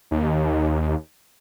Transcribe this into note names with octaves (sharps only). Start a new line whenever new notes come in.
D#2